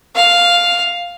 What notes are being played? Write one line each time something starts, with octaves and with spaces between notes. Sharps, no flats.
F5